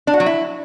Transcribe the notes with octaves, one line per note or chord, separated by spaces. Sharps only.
D4
F#4
F#3
E4